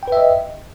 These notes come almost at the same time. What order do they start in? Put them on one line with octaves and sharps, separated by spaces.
G5 B4 E5 D#5